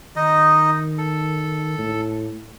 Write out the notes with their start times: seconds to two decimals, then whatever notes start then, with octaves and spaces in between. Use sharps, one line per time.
0.16 D#3 D#4 D#5
0.98 A4
1.78 A2